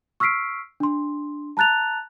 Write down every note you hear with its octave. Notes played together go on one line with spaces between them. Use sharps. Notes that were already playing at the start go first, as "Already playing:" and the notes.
C#6 E6 F6 B6 C7 D7
D4 C6
A5 A#5 F#6 A6 F7